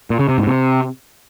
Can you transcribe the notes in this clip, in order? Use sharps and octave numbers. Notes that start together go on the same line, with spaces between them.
A#2
C#3
C3
G#2
C3